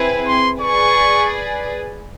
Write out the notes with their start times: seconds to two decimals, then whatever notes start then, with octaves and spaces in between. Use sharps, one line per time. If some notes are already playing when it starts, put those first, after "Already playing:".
Already playing: C4 E4 G#4 B4
0.27 C6
0.61 G#4 B4 D5 C#6